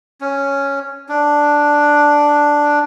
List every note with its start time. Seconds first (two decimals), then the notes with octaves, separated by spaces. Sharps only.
0.21 C#4
1.09 D4